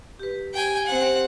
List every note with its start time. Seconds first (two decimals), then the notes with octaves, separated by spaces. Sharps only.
0.19 G4 B4
0.54 G4 G5 G#5
0.86 C4 F#5